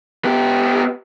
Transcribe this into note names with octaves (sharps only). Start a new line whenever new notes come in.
B3 G4